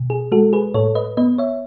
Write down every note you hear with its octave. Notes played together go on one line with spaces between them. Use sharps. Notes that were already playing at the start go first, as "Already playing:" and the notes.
Already playing: B2
G#4
G#3 F#4 A4
G#4 B4
A2 A4 C#5
B4 D#5
B3 B4 D#5
C#5 E5